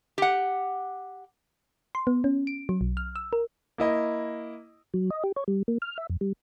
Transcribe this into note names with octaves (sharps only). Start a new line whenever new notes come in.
G4 F#5
C6
B3
C#4
D7
F#3
B1
F6
E6
A#4
A#3 E4 D#5
F#3
D#5
G4
C#5
G3
A#3
F6
E5
F2
G3